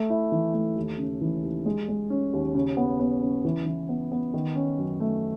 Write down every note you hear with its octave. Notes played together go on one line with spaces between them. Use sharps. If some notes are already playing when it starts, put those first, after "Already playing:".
Already playing: A3
E4
E3
A3
D#2
C#3
E3
D#2
G#3
G#3
C#4
D#2
C#3
B3
B3
C#3
E3
E3
B3
B3
D#3
C#4
F#2
A3